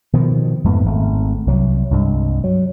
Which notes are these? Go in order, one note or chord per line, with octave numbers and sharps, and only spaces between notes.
B2 D#3 F3
F2 G#2 A3 B3
G#1 A3
C2 F#3
C2 G2 G#3
F#3